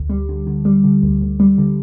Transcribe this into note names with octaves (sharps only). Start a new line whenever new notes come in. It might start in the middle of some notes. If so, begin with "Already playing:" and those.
Already playing: D2
G3
D3
D3
G3
D3
D2
D2
G3
D3